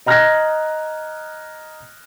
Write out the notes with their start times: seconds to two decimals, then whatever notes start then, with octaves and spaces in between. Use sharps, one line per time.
0.06 D#5 A#5 F6 F#6 G#6 A#6